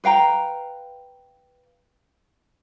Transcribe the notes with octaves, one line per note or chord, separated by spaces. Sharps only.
B4 F5 G5 A#5